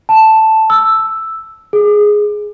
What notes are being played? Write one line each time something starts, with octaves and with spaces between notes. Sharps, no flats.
A5
E6
G#4